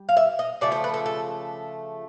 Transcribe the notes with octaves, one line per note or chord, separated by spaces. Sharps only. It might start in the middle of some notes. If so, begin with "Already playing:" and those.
Already playing: G3
F5
E5
D#5
C#3 F3 A3 D5
C5
B4
A4
A4